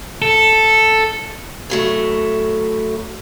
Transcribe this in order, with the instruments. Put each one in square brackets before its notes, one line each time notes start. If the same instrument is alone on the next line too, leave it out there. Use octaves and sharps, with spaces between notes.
[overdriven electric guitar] A4
[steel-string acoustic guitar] A2 F#3 A3